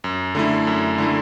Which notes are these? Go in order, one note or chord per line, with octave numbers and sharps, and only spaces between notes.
F#2
D3 A3 E4
F#2
D3 A3 E4